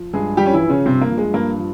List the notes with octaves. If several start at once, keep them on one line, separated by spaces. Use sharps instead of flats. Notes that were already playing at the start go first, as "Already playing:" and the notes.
Already playing: F3
G2 G#3 G#4
F3 G3 G4
C#4
E3 E4
F3
C#3 C#4
G2 C3 C4
A#3
F3
G#3
G2 A#3
F3